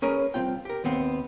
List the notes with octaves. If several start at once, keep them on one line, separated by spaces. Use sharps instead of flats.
C#4 G#4 A#4 B4
C2 C4 F4 G5
G4 A#4
D#2 B3 C4